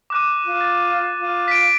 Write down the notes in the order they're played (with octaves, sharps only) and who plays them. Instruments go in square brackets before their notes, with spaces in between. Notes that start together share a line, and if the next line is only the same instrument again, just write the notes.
[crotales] D6 F#6 D#7
[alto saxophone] F4
[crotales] A6
[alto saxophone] F4
[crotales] B6 D7